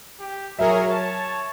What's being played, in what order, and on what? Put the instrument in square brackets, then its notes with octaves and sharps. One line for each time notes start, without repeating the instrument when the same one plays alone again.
[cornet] G4
[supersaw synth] F#3 A#4 C#5 [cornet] G#4 [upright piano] E5
[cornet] C#5 [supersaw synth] A5